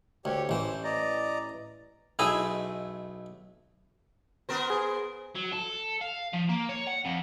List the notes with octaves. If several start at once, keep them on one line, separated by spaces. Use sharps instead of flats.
D2 G4 C#5
A1 E3 C5
D5 D#5 A#5
B1 A3 E4 G#4 D#5
B3 A#4 C5
G#4
F#3
A4
F5
F3
A#3
C#5
F#5
F2